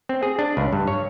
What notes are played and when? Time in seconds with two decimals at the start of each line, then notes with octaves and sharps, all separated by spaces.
0.09 C4
0.23 G#4
0.39 D4
0.57 C#2
0.73 G2
0.88 C#5